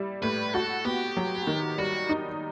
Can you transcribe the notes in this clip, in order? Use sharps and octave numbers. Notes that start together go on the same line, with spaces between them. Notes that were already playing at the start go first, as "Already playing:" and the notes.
Already playing: G3 E4
A2 B4
F#4 A4
B3 G4
F#3
D#3
G3 F#4
D#4